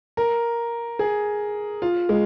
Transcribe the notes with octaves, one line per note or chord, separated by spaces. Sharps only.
A#4
G#4
F4
G#3